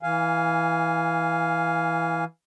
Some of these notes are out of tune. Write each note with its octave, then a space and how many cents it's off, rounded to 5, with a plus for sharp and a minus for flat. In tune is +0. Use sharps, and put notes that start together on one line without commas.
E3 -10 F5 +0 G#5 +0